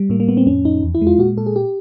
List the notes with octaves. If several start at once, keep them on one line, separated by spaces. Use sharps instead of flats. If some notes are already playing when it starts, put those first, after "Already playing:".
Already playing: G3
A2 A#3
A#3
A2 B3
C4
F2 C#4
F2 D#4
E2
E4
G#3
F4
A#2 F#4
A#2 A4
G#4
G4